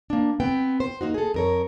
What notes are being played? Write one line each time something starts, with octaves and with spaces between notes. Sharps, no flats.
A#3 D4
B3 C4 G5
C5
A#3 D#4 F#4
G#4 A4
F2 A#4 C#5